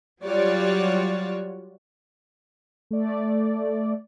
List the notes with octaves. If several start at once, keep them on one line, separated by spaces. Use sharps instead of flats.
F#3 G3 F4 F#4 C#5 D5
A3 D5